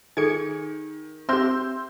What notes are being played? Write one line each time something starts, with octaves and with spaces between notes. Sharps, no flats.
D#3 G#4 A4 G#5 G#6 C#7
C4 G4 E5 C6 E6 G6